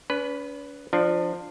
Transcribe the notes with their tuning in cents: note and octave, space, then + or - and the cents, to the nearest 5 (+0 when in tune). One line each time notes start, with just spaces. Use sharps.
C#4 +45 B4 +0
F3 +0 D4 +20